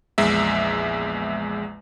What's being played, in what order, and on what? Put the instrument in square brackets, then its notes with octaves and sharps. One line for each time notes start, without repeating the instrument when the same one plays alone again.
[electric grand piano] A#1 E2 G#3 E5